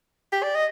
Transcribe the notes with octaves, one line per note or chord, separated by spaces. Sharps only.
G4
D5
D#5